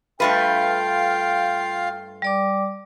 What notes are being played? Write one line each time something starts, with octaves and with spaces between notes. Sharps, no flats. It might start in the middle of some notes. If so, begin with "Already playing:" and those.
G2 A3 F4 B4 F5 G5
G3 D5 D6